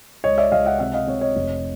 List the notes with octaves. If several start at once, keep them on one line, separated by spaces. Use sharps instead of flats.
C#2 C#5 D#5
D5 E5
C#2 D#5 F5
E5 F#5
C3 E5 F#5
D#5 F5
C3 C#5 D#5
C#5 D#5
F1